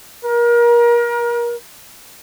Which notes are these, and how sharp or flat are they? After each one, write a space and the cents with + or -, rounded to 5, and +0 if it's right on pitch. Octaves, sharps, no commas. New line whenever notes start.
A#4 +30